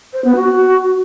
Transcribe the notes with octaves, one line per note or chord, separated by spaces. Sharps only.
C5
B3
F#4